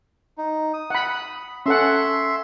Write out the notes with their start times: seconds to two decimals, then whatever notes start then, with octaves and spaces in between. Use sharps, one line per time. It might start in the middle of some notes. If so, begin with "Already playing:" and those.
0.38 D#4
0.74 D#6
0.90 F#5 B5
1.66 C#4 A4 E5 F#5 C6